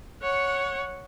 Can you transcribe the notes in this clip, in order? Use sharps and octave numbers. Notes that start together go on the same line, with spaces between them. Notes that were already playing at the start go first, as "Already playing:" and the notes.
C#5 F#5